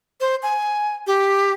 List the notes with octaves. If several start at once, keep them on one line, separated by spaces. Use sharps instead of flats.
C5
G#5
G4